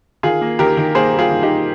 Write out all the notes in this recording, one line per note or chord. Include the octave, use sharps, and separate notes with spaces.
D#3 F4 G#4
A#3
D#3 G4 A#4
D#3
A#3 G#4 C5
G3
F4 G#4
D#3
D#4 G4
G3